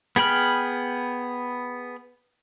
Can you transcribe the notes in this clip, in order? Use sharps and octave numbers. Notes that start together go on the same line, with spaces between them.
B3 G#4 G5 B5 F6